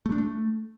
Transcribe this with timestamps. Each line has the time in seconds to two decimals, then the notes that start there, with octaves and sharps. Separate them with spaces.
0.06 A3
0.12 D4
0.18 A3